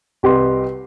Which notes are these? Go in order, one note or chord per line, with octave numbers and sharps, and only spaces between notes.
C2 G4 B4 D#5 C6